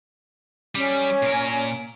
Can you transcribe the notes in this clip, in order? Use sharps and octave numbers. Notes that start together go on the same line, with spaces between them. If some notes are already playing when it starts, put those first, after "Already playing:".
G3 C#4
A#2 A#4